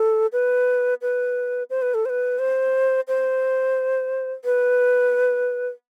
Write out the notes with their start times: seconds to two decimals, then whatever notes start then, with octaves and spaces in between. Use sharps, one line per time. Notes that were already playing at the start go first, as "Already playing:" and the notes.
Already playing: A4
0.33 B4
1.02 B4
1.70 C5
1.82 B4
1.94 A4
2.05 C5
2.09 B4
2.39 C5
3.08 C5
4.45 B4